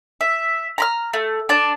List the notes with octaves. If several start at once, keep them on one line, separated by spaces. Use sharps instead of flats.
E5
A#5 B5 F6
A3
D4 A5